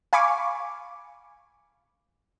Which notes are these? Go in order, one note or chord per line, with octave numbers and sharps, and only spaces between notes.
F5 G#5 B5 C#6 D6